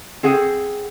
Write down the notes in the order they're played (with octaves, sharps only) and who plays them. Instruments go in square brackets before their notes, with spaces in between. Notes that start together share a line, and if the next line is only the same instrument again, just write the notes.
[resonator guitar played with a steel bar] C4 G#4 F#5